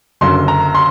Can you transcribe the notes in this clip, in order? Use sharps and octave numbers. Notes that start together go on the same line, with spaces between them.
F#1 F#2 D3 C6
A#5
C6